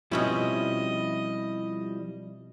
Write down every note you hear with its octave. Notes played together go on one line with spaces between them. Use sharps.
B2 F3 G3 C4 C#4 E4 D#5